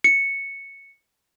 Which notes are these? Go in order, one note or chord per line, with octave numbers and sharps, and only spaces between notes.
C#7